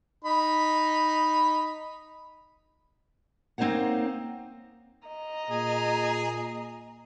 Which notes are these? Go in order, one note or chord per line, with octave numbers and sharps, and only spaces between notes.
D#4 B5
A#3 C4 D#4 C5 C#5 F#5
D#5 A#5
A#2 G#4